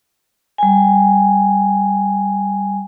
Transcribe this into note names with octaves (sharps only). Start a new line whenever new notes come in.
G3 G#5